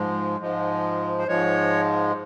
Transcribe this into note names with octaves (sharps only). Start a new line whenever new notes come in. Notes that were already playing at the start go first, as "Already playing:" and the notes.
Already playing: G#2 F3 G#3
G#2 F3 G#3
C5
G#2 F3 G#3 C#5